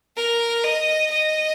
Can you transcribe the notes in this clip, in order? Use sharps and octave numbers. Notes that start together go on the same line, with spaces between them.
A#4
D#5
D#5